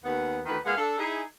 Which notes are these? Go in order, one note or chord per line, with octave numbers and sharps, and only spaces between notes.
D#2 B3
D2 D#3 E3 B4
A#2 G#3 B3 F5
D4 A4
D#4 E4 G#4